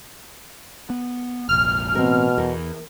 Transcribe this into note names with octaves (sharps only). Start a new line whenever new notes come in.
B3
F1 A#1 F6
A1 B2 C4 A#4
E2 A#4